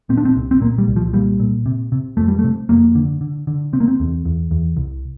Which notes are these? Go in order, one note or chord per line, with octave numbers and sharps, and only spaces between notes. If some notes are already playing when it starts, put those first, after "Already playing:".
A#2 C4
D4
C4
C2
C4
A#2 A#3
G3
C2
F3
A#2 G3
A#2
C3
C3
F2 A3
G3
A3
C3
F2 A#3
D3
D3
D3
C3 C4
A#3
C4
E2
E2
E2
C2